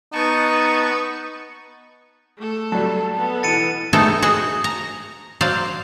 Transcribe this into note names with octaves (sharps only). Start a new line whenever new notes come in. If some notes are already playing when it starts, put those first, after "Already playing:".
B3 D#4 B4 A5 C#6
A3 A4
F#3 G3 A5
B3 A4
B2 E3 A6 C#7 D#7
A3 B3 D#4 G#4 A4 G5
F#4 G#4 D#5
A#5
F#3 C5 D5 F5